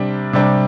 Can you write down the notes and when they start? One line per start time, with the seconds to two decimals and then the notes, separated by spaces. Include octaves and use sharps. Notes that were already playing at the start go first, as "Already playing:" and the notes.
Already playing: C3 G3 D4
0.33 C3 G3 D4